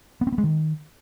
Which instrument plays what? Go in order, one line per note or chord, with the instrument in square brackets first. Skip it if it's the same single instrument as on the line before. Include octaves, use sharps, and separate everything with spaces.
[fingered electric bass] B3
C4
B3
G#3
D#3